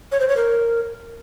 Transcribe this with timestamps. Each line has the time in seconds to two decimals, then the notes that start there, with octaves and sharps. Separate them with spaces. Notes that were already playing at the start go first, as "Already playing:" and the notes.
0.12 C#5
0.20 C5
0.29 C#5
0.37 A#4